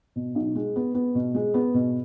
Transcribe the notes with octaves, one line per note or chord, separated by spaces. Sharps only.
B2
B1
G#3
B3
B3
B2
G#3
B3
B2